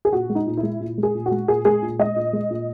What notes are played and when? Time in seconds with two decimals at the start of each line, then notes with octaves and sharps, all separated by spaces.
0.05 G#4
0.12 A#2 F#4
0.30 G#3
0.35 D#4
0.47 A#2
0.57 E4
0.63 G#3
0.80 A#2
0.98 G#3
1.03 G#4
1.15 A#2
1.26 F#4
1.31 G#3
1.48 A#2 G#4
1.65 G#3 G#4
1.82 A#2
1.99 G#3 D#5
2.16 A#2
2.33 G#3
2.51 A#2